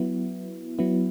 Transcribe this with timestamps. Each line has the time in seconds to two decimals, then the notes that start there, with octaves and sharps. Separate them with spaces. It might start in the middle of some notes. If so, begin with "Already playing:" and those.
Already playing: F#3 B3 E4
0.79 F#3 B3 E4